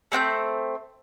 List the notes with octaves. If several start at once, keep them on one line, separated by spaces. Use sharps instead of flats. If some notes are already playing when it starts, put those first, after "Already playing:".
A3 C4 G5 G6